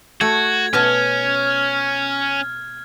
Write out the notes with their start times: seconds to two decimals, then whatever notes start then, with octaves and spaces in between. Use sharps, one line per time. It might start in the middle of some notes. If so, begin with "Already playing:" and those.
0.21 A3 F#4 G#6
0.73 B2 C#4 D#5 A5 F6